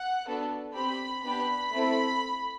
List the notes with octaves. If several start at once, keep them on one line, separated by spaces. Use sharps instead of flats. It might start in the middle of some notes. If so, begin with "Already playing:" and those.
Already playing: F#5
B3 D4 F#4 A4
C4 G4 B5
B3 D4 G4 B5
A3 C4 E4 A4